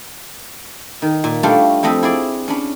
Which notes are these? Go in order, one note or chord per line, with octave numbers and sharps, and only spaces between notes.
D#3
A#2
G3 A3 D4 F4 C#5
F2 A3 C4 D#5 B5
E4 G#4 D5
C#4 D4 B5